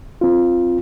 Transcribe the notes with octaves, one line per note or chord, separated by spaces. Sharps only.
C4 F4